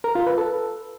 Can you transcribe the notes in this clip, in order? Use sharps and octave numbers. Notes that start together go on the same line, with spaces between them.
A#4
F4
B4
A4